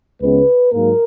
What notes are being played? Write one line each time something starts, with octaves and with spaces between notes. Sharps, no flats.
C#2 C#3 G#3 B3 B4
G#2 F#3 A#3 A#4